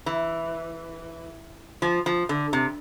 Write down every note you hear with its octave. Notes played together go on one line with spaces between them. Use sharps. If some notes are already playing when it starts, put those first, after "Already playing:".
E3
F3
F3
D3
C3